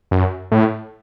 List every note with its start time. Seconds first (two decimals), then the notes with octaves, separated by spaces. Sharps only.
0.11 F#2
0.52 A2